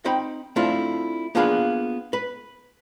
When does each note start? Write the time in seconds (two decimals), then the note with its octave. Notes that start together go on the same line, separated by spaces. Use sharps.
0.05 C4 D#4 G5 B5
0.56 A3 C4 D4 E4 F4
1.35 A#3 B3 D4 F4 G#4 B5
2.13 B4